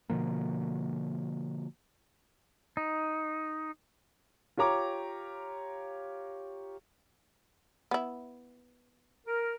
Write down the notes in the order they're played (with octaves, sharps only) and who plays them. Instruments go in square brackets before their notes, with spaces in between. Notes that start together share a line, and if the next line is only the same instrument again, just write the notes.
[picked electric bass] B2 D3 F3 A#3
[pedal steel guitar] D#4
[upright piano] F4 G4 C#5 A#5 D6
[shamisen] B3 E4
[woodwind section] A#4